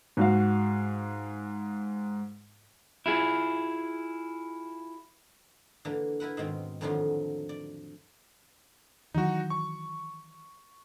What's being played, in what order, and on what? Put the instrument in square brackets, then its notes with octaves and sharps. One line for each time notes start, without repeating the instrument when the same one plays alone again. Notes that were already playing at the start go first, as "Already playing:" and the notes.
[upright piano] G#2 F#4 F5
[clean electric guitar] E4 F4 G#4
[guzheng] D3 E3 A#3
E4 A#4 B4 F#5
G#2 B2 D#3 C4
F2 A2 D3 D#3 F3 F#3
D5
[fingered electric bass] D#3 E3 F#3 [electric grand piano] D#4 F#4
[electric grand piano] C#6